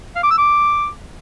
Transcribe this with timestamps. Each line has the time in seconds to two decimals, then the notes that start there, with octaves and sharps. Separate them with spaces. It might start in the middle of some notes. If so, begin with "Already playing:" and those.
0.16 F5
0.23 D6
0.31 E6
0.38 D6